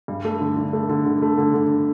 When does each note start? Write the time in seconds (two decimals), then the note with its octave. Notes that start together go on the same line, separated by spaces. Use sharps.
0.08 G2
0.25 A3
0.40 D3
0.57 D3
0.73 A3
0.89 D3
1.05 D3
1.22 A3
1.38 D3
1.54 D3